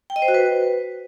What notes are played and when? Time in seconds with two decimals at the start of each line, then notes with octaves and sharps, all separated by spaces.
0.10 G5
0.16 D#5
0.22 C5
0.28 F#4
0.34 B4